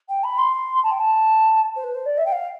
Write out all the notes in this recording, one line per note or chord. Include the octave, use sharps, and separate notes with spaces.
G5
B5
C6
A5
G5
A5
C5
B4
C5
D5
E5
G5
F5